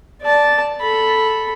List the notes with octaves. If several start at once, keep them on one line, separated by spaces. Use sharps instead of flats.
D5 A5
A4 B5